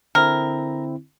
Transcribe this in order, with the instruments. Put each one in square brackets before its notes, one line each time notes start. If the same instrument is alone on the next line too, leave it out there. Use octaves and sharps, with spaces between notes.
[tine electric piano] D3 C4 E4 [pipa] A#4